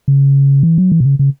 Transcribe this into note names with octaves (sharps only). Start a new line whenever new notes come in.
C#3
E3
F#3
E3
B2
C#3
C#3